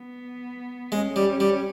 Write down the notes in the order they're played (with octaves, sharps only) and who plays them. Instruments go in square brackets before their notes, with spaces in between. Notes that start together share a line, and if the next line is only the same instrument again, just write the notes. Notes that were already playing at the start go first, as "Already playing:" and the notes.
Already playing: [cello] B3
[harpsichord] G#3 [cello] C#4
[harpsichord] G3
[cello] C#4
[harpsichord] G3